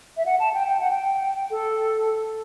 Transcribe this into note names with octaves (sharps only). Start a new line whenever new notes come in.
E5
F#5
A5
G5
G5
F#5
G5
A4